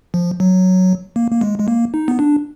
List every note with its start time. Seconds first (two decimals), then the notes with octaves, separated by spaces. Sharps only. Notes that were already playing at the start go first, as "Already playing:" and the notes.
0.14 F3
0.40 F#3
1.16 A#3
1.31 A#3
1.41 G#3
1.59 G#3
1.68 A#3
1.94 D#4
2.08 B3
2.19 D4